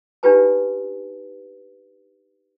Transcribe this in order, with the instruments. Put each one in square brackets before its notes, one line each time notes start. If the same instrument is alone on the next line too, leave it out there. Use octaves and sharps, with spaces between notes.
[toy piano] D4 D#4 F4 G4 B4 A5